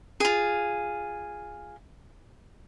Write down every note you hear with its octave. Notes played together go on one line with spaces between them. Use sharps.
F4 G#4